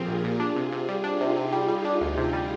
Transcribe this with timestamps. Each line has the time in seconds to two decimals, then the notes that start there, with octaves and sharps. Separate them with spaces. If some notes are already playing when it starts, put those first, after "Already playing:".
Already playing: A#2 F3 C4 F4 G4 G#4 A#4
0.08 A#1
0.24 A#2
0.40 D4 F4 G#4
0.56 C3
0.72 C3 F4 G#4
0.89 G3
1.04 D4 D#4 G4
1.21 C3
1.37 C3
1.53 G3
1.68 G3
1.85 D4
2.01 D2
2.17 C3
2.33 G3